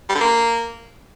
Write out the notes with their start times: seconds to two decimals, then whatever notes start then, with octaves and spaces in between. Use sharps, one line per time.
0.09 G3
0.15 D3
0.21 A#3